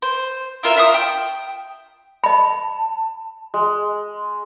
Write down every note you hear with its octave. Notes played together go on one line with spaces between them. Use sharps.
C5
E4 F4 A#4 E5
F4 E5 C#6 D#6
G5
D#5 A5 B5
G#3